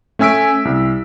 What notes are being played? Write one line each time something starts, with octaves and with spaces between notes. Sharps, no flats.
A3 C#4 G#5 E6 B6 D7
C2